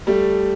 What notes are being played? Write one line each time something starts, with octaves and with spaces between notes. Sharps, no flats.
G3 A3